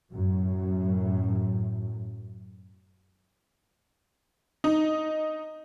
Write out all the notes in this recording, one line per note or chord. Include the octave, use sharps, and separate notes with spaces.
F#2 A2
D#4